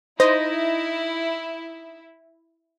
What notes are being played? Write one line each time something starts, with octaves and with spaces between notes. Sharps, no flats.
D#4 E4 C5 D#5